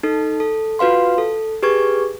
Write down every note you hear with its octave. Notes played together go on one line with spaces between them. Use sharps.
D#4 A4
A4
F4 F#4 B4 F5 C6
A4
G4 G#4 B4 C#6 G#6